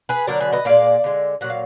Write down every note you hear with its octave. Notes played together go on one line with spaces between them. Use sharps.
G#4 B4
D3 F#3 A#4 D5
G#4 B4
B4 D#5
A#2 G#3 D5 F5
D3 G#3
A#2 F#3 F#5
F5